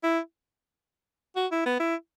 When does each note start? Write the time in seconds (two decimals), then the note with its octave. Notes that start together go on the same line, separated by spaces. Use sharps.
0.03 E4
1.36 F#4
1.51 E4
1.66 B3
1.80 E4